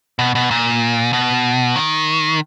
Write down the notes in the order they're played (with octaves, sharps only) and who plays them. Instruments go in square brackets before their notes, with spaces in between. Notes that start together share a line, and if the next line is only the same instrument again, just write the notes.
[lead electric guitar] B2
B2
A#2
B2
D#3